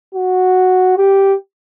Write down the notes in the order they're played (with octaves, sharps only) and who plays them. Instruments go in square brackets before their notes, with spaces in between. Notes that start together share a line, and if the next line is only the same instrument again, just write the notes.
[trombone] F#4
G4